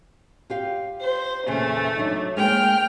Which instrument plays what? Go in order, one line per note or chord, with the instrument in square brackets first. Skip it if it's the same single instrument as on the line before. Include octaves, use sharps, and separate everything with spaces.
[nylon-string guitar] F4 G4 F5
[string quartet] C5
[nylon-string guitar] E2 A#2 C#3 [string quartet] A3
[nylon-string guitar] F#3 D4 D#4
[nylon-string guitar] G#3 A#3 [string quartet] G5 F6